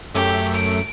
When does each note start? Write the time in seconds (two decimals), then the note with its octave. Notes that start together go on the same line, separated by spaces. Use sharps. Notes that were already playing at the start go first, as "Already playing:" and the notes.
0.15 F#2 A3 G4
0.55 D7